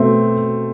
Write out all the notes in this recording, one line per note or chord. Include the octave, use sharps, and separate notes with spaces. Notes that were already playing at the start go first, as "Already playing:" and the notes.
Already playing: B2 A3 C4